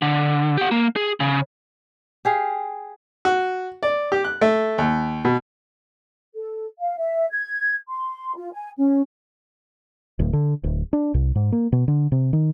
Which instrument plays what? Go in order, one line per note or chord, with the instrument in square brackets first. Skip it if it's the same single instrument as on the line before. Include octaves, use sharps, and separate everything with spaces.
[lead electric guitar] D3
G4 F#5
A#3
G#4
C#3
[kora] G4 G#4 F5
[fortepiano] F#4
D5
G4
F#6
A3
D#2
B2
[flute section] A4
F5
E5
G#6
C6
F4
G#5
C#4
[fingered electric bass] D1
D3
D1
D4
C2
G#2
A#3
B2
D3
C3
D#3